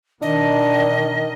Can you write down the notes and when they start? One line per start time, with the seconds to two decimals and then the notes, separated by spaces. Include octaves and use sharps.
0.22 B2 D#3 D4 D#5